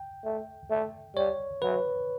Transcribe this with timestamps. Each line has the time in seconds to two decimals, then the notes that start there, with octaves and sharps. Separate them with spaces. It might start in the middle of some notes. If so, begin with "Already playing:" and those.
Already playing: G5
0.25 A3
0.70 A3
1.16 G3 C#5
1.62 F#3 B4